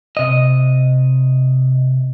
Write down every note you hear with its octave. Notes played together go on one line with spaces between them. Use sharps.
C3 D#5